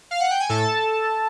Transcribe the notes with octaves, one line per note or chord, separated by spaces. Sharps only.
F5
F#5
G5
G#5
A2 A4 A5